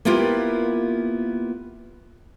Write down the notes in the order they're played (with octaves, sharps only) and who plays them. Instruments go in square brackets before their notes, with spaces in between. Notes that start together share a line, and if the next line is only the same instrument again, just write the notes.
[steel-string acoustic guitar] A#3 B3 E4 F4 G4 A#4